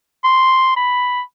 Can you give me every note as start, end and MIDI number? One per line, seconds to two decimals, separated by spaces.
0.24 0.75 84
0.76 1.21 83